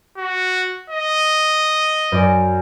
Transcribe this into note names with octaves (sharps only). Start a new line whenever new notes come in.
F#4
D#5
F#2 D5 G#5